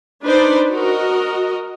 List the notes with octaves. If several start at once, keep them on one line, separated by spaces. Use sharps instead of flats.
D4 D#4 B4 C5 D5
F#4 A#4 D#5